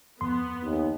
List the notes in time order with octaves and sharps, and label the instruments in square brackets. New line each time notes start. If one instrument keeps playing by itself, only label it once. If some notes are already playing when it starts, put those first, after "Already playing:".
[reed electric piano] F2 C6 [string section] B3
[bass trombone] D#2